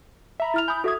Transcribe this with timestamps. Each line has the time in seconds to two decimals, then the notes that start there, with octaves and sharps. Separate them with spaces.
0.40 E5 A#5 B5
0.54 E4 F6 F7
0.68 G#5 B5 D#6 G6
0.84 F#4 A4 E5 D#6 G#6